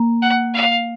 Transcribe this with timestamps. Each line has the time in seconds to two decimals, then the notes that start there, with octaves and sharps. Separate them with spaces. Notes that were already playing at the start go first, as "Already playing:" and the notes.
Already playing: A#3
0.22 F#5
0.54 F5